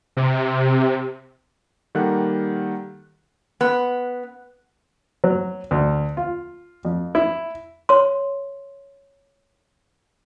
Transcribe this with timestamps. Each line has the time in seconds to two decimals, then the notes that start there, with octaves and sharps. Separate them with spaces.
0.17 C3
1.95 D#3 G3 A#3 A4 F#5 F#6
3.61 B3
5.24 F#3
5.71 D2
6.17 F4
6.85 F2
7.15 E4
7.89 C#5 C6